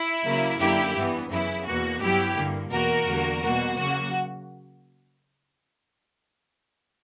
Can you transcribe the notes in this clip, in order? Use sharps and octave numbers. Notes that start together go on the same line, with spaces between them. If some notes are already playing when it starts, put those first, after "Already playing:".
Already playing: E4
C#3 F#3 A#3
F#2 D3 A#3 E4 G4
G2 E3 B3
F#2 C#3 E3 B3 E4
E2 B2 A#3 F#4
G2 F#3 B3 E4 G4
G2 D3 A#3
E2 B2 A#3 F#4 A#4
E2 D3 G3 A#3
B2 G3 A#3 F#4
C#3 F#3 A#3 F#4